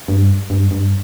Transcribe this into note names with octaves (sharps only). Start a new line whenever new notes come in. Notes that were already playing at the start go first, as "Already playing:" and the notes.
G2
G2
G2